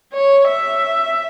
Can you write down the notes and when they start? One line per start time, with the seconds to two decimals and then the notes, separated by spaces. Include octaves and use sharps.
0.14 C#5
0.49 E5